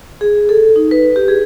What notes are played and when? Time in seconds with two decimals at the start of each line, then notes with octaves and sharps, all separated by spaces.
0.21 G#4
0.49 A4
0.76 D#4
0.91 B4
1.16 G4
1.28 G#4